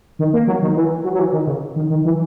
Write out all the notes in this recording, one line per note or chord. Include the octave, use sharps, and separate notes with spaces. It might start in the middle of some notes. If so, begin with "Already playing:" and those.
D#3
A#3
F#3
D#3
E3
F#3
F#3
E3
D#3
C#3
D#3
D#3
E3